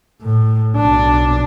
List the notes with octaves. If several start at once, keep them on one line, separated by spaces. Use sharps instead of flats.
A2
B1 D4